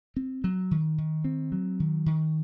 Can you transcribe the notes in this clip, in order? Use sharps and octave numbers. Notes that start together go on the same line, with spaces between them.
C4
F#3
D#3
D#3
C4
F#3
D#3
D#3